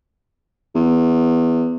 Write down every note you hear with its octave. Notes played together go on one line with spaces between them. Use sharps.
E2